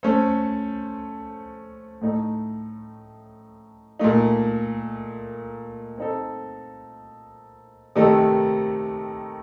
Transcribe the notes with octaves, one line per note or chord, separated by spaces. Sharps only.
A3 C#4 A4 C5
A2 A3 D#4
A#2 A3 D#4
C4 D#4 A4
C3 D#3 A3 D#4 A4